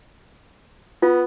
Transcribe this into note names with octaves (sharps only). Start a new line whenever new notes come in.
B3 F4